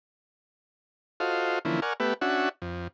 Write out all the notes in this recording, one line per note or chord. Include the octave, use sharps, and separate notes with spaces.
F4 F#4 A4 C5 D#5 F5
D3 E3 F3 A#3 C#4 E4
A#4 D5 F#5 G#5 C#6 F6
A3 B3 G4 B4 E5
C#4 D4 F#4 E5 F#5
F2